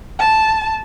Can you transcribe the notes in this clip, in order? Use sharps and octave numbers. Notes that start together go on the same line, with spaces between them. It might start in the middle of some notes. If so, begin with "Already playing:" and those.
A5